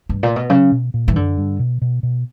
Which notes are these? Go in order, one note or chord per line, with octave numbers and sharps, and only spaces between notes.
G2
A#2
B2
C#3 F#3
B2
A#2
E3
G2
F#2 D3
G2
B2
B2
B2